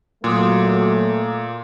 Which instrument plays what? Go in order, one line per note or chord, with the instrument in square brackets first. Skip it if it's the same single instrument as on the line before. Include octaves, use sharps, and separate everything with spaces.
[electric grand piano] A#2 [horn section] F#3 [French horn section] A3 A#3 [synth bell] C6 D6 D#6